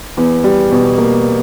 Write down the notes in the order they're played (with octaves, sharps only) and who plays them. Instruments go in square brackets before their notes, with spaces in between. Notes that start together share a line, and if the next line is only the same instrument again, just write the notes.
[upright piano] E2
G3
B2
A#3